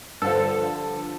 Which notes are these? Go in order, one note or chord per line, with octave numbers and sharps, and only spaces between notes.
G2 D3 F3 A4